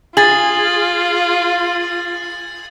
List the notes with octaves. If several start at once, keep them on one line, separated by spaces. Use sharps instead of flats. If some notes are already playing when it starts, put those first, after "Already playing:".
F4 G#4 A6 F#7